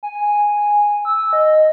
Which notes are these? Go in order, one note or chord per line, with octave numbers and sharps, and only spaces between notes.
G#5
E6
D#5